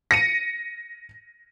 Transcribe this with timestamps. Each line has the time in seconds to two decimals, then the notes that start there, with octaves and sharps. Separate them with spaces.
0.11 A#6 C#7 D#7